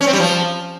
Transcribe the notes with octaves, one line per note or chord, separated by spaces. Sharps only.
C#4
C4
G3
F3